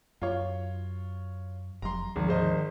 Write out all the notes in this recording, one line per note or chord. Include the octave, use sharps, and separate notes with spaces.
F#2 F4 C#5
F1 F#3 A#5 C6
G#1 D2 F3
G#1 C5 D#5